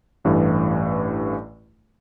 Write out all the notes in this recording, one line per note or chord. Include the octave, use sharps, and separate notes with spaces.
A1 G2 E3 A3